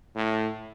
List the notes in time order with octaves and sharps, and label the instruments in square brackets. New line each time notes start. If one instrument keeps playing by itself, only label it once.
[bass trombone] A2